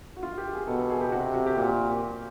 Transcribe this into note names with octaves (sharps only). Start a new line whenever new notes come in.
F#4
F4
G4
G#4
B2 A4
A4
G#4
G4
C3 F#4
F#4
G4
A#2 F#4